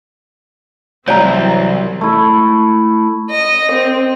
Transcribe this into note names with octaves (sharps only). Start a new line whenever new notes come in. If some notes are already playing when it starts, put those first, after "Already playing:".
C2 E3 F#3 C4 C#5 D5 G5 A#5
A3 E4
D#5
C4